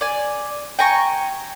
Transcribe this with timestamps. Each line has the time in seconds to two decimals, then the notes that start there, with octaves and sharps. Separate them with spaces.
0.01 D5 G#5
0.79 G5 G#5 A#5 C#6